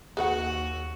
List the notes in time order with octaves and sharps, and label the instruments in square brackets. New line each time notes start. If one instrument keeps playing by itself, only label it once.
[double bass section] D#2 [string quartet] F#4 [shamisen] G#4 B4 F#5